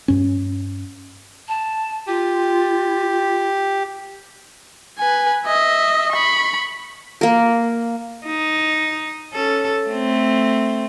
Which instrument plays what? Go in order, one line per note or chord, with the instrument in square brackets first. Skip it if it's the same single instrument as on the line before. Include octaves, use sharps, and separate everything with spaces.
[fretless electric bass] G2 C#4
[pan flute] A5
[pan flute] F4 [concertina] G4
[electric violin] B4 G#5
D#5 E5
B5 C#6
[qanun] A#3 A#4
[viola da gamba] D#4
C#4 A4
A3 C4